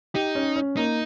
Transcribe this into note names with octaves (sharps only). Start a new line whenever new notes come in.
D#4 G4
C#4
C#4
A#3 D#4